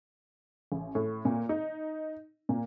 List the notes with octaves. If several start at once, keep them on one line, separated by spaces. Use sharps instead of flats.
A1
A2
A#2
D#4
A#2